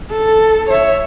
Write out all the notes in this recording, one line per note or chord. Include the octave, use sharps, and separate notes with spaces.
A4
C#5 E5